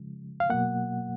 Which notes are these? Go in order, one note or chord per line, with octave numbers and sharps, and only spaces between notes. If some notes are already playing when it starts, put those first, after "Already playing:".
Already playing: C#3 F3 G#3
F5
B2 F#3 A#3 F#5